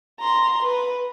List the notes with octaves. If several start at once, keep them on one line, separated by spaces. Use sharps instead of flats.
A#5 C6
B4